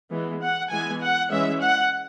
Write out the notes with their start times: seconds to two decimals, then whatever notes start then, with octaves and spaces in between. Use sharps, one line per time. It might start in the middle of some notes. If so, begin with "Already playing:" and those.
0.11 E3 G#3 B3
0.41 F#5
0.70 E3 G#3 B3 G#5
1.01 F#5
1.30 E3 G#3 C#4 E5
1.61 F#5